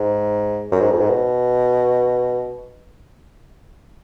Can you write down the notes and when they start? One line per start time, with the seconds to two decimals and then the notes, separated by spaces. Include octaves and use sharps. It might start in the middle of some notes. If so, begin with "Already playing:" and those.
Already playing: G#2
0.72 F#2
0.81 G#2
0.91 F2
1.00 G#2
1.10 B2